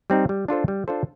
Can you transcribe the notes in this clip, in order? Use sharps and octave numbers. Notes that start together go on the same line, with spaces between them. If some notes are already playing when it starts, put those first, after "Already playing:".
G3 C4 D#4
G3
D4 F4 A4 C5
G3
D4 F4 A4 C5